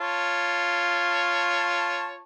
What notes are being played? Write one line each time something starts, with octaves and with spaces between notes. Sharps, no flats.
F4 C#5 A5